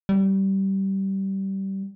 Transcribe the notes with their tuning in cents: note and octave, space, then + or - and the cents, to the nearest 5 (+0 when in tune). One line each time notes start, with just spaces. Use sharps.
G3 -20